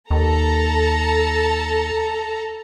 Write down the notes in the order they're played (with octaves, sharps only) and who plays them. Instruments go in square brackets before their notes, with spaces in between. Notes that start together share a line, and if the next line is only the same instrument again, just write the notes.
[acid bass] D#2 [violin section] A4 A5 A#5